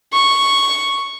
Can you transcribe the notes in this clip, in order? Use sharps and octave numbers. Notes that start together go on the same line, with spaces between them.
C#6